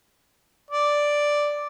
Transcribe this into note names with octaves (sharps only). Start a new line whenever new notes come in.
D5